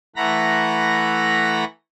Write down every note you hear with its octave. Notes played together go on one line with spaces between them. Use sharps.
E3 A3 F#5 A#5 B5 A#6